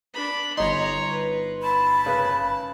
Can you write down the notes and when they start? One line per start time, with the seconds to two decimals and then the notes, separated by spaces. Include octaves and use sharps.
0.14 D4 B5
0.57 G1 D#4 C#5 A#5 C6
1.12 B4
1.63 A5 B5
2.06 C#3 B4